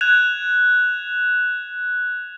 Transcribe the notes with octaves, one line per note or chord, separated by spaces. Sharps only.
F#6 G#6 E7 F7